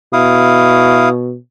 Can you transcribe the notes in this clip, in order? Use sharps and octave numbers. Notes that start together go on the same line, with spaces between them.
B2 E4 F5 D#6